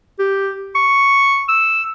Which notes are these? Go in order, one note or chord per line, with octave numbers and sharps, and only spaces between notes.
G4
C#6
E6